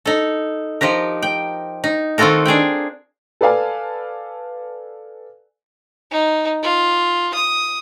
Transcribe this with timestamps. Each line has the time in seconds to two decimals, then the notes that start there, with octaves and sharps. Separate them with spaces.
0.05 D#4 A4
0.81 F3 D#4 G4 A#4
1.23 G5
1.84 D#4
2.18 D#3 C4 F4 F#4 A4 A#4
2.45 D4 G#4 F5 G5
3.41 A4 B4 D5 F5 G#5 A5
6.11 D#4
6.63 F4
7.34 D#6